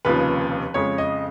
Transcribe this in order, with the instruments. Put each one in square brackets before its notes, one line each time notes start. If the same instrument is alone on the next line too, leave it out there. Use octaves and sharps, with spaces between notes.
[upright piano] F1 D#2 C#3 F3 B4
F2 C#3 G#3 C#5
D#5